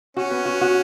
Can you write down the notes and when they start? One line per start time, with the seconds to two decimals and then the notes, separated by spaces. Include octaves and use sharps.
0.17 C#4 F#4
0.31 B3
0.46 F#4
0.61 F#4